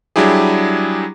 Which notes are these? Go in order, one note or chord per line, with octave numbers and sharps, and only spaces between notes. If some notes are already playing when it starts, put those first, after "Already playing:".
F#3 G3 D4 E4 G4 G#4